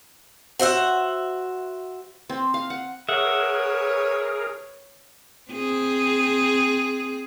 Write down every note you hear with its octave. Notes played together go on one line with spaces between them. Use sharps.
F#4 C5 E5 F#5
C4
F5
F#5
G#4 A#4 B4 C#5 E5 F#5
C4 G#4